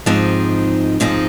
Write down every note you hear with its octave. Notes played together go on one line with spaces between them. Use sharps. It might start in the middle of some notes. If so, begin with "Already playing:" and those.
G#2 F3 C4 D#4 G#4
G#2 F3 C4 D#4 G#4